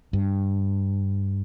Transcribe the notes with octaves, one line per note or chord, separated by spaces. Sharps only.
G2